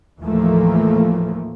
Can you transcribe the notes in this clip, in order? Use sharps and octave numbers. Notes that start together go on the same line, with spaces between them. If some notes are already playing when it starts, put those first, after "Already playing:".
D#2 A2 E3 F3 A3 A#3